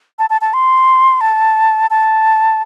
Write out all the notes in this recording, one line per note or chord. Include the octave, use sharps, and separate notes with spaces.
A5
A5
A5
C6
A5
A5